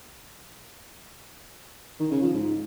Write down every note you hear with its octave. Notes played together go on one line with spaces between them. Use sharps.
D#3
C#3
F3
G#2